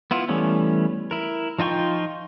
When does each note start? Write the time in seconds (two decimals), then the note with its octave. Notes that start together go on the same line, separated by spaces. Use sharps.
0.11 B3 E4 F4
0.29 E3 G3 A3 B3 C#4
1.11 E4 A#4
1.59 F3 D#4 F4 G5 C#6